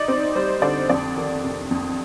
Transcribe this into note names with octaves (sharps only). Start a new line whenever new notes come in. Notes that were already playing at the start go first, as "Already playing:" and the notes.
Already playing: D#4 D5
C4
G3 C5
D3 D5
F2 D5
D#3
C3
F2